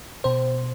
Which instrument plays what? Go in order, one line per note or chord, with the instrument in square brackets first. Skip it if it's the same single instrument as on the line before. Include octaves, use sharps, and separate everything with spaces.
[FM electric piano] B2 C5